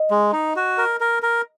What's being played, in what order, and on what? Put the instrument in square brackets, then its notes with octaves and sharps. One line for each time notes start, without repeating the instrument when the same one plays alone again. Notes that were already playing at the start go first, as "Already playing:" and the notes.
Already playing: [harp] D#5
[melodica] G#3
D#4
F#4
A#4
A#4
A#4